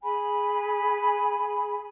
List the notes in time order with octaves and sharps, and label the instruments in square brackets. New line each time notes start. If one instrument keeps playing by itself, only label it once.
[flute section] G#4 G#5 B5